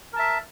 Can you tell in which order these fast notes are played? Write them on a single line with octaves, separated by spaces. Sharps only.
A#4 A5 E5